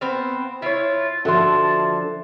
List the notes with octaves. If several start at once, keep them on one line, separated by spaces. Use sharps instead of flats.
B3 C4 F5
E4 F4 C#5
D3 F3 F#4 E5 F#5 A5 C6